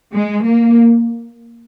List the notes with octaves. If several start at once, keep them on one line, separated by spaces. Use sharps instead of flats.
G#3
A#3